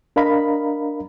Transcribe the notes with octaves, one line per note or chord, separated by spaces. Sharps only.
D4 A#4 D#5 F5 A#5 B5